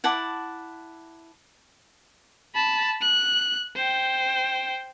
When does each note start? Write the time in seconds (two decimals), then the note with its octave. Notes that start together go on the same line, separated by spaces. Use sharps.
0.04 E4 F#5 A5 D6
2.55 A5 B5
3.01 F#6
3.76 C5 G5